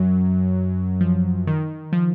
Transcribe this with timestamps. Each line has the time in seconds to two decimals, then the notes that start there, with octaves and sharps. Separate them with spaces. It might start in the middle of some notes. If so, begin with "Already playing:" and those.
Already playing: F#2 F#3
1.01 F3
1.47 D#3
1.93 F3